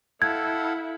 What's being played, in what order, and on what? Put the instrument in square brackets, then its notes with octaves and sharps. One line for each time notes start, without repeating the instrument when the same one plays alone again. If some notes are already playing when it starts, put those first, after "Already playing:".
[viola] E4 [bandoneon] A4 F5 F#5 [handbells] G#6